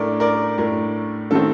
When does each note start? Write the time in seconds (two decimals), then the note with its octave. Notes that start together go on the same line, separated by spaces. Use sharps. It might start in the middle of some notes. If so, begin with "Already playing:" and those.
Already playing: A2 A3 D4 A#4 D5
0.20 A#4 D5
0.58 A2 A3 D4 A#4
1.31 D#3 A3 C4 A4